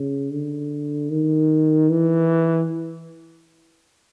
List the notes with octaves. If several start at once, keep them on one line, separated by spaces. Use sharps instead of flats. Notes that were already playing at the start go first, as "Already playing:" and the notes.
Already playing: C#3
D3
D#3
E3